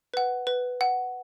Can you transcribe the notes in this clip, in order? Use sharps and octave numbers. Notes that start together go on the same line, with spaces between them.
B4 F#5
B4
F#5